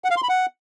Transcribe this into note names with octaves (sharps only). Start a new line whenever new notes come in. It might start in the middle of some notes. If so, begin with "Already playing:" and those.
F#5
F5
C6
B5
F#5